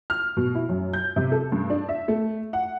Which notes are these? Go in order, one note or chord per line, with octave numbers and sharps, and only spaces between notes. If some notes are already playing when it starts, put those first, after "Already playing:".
F6
B2
E4
F#2
G6
C3
A4
G2
D4
E5
A3
F#5